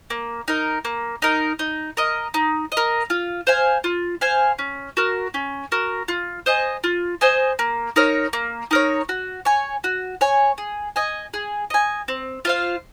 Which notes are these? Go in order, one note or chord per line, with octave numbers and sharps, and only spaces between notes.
A#3
D#4 A#4
A#3
D#4 A#4
D#4
A#4 D#5
D#4
D#5
A#4
F4
C5 F5 G#5
F4
C5 F5 G#5
C#4
F#4 A#4
C#4
F#4 A#4
F4
C5 D#5 G#5
F4
C5 D#5 G#5
A#3
D#4 A#4 C#5
A#3
D#4 A#4 C#5
F#4
C#5 G#5
F#4
C#5 G#5
G#4
D#5 G#5
G#4
D#5 G#5
C4
F4 C5 F5